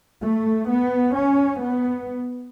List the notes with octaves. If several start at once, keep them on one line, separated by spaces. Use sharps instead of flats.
A3
B3
C#4
B3